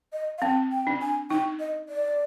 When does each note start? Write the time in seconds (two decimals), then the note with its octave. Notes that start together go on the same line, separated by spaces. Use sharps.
0.13 D#5
0.38 F5
0.42 C4 G5
0.71 G5
0.87 D4
1.01 G#5
1.30 D#4 G5
1.60 D#5
1.89 D5